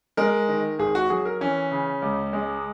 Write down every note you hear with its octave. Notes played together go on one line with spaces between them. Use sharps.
G#3 A#4
D#3
G#1 G#4
F#4
F#3 G#4
A#4
E3 C#4
C#3
C#2
G#3